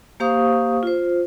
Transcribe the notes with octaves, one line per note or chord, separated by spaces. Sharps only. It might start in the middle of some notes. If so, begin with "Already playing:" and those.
A#3 G4 C5 F5 C#6 D#6
F4 C5